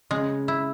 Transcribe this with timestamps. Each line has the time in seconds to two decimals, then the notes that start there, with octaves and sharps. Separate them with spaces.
0.11 C#3 G#3
0.48 E4